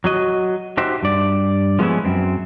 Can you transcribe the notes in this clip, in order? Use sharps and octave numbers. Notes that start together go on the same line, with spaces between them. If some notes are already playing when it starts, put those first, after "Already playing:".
F#3 F#4 D#5
D#4 F#4 G4 C5 E5
G2 D5
F3 G#3 B3 C#4 E4
F#2 C4